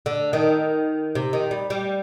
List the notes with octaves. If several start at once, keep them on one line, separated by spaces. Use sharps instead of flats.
D3
D#3
C3
D#3
G3
G3